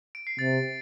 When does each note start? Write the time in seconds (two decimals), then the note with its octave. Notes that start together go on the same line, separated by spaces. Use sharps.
0.15 D7
0.27 C7
0.39 C3 A6